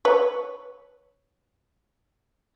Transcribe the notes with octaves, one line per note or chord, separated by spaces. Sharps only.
B4 C#5